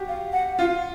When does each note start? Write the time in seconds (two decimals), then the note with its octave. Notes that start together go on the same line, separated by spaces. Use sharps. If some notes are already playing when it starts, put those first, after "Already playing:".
Already playing: F#4 G4
0.08 F5
0.33 F#5
0.59 F4 F5